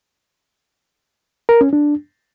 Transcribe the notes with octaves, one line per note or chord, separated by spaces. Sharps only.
A#4
C#4
D4